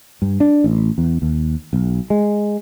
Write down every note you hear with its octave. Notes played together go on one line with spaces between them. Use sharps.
G2
D4
A1
E2
D#2
B1
G#3